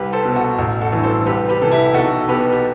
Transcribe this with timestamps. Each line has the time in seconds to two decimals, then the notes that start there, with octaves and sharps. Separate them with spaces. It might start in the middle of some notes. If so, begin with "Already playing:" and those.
Already playing: C2 G4 B4
0.13 A4 C5
0.25 B2
0.35 F#4 A4
0.59 A1
0.81 F#4 A4
0.92 G2 E3
1.04 A4 C5
1.26 C2 G4 B4
1.49 G4 B4
1.61 C3 E3 A4
1.72 E4 G4
1.94 B1 F#4 A4
2.28 B2 G4 B4
2.52 G4